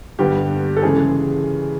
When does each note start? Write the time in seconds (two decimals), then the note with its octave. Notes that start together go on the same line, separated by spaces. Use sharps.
0.19 G2 D3 G3 B3 G4
0.77 A4
0.82 C#3 E3 G#3 G#4